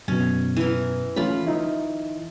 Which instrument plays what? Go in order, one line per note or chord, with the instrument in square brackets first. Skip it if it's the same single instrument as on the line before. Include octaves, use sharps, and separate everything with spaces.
[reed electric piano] F#2 B2 [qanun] C#4
[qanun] E3 A#4
[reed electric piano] E3 A3 C#4 [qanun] F4 B5
[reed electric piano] E3 D#4 E4